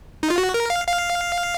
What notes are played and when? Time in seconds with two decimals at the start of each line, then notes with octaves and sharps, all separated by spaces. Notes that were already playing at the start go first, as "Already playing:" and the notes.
0.23 D#4
0.30 F4
0.38 F#4
0.54 A#4
0.70 F5
0.87 F5